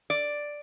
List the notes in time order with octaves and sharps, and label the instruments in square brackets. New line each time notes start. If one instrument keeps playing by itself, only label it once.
[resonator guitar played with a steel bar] D5